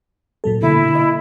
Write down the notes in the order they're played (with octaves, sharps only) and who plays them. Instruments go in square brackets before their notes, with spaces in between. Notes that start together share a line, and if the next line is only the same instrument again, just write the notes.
[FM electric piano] A#2 F#3 A4
[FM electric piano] B2 D3 A#3 [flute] E4
[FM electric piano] D#5